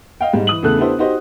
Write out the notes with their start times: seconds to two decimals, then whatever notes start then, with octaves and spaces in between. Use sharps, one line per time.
0.21 D#5 F5 G5
0.33 G#2 G3
0.47 E3 D#6 F#7
0.62 E2 C#3 A3 A4 F#6
0.77 B3 D4 E4 G4 A4 C5
0.98 D#4 F#4 G4 C5 D#5